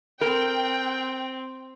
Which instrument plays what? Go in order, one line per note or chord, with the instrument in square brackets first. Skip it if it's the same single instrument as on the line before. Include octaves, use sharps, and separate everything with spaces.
[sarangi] C4 [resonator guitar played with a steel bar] A#4 [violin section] G5